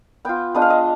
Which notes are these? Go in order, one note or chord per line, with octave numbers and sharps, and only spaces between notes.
B3 F4 G5
G#3 B3 D4 F4 D#5
F5
D#5